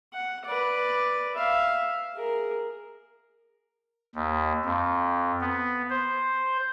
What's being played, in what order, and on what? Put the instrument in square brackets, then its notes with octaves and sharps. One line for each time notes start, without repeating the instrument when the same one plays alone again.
[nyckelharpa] F#5
B4 D5
E5 F5
G#4 A#4
[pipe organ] D#2
F2
B3
C5